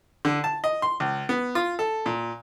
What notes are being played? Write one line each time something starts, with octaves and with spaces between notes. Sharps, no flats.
D3
A5
D#5
C6
C#2
B3
F4
A4
A#2